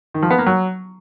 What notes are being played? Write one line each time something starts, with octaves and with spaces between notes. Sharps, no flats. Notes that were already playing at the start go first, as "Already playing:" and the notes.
D#3
F3
B3
A#3
F#3